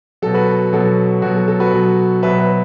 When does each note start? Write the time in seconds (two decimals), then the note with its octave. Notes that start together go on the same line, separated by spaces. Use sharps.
0.22 B2 F#3 A4
0.34 F#4 B4
0.73 B2 F#3 A4
1.22 B2 F#3 F#4
1.36 A4
1.48 A4
1.60 F#4 B4
1.73 B2 F#3
2.23 B2 F#3 B4 E5
2.39 B4 E5